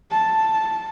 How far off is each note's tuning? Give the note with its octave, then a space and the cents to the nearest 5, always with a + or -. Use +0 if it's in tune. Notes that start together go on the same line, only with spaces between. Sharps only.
A5 +0